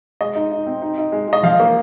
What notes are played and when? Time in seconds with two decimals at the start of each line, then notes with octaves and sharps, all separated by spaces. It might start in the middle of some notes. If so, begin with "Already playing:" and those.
0.21 G#3 D#5
0.35 D#4
0.52 D#4
0.67 C4
0.82 D#4
0.98 D#4
1.12 G#3
1.28 G#3 D#5
1.43 F3 F5
1.60 A#3